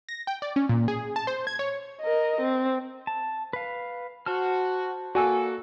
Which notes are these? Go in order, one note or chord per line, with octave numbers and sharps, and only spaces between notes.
A#6
G5
D5
C#4
A#2
G#4
A5
C5
G#6
C#5
A#4 D#5
C4
A5
B4 F5
F#4 C5 A5 F6
A#3 F#4 A4 D5 G#5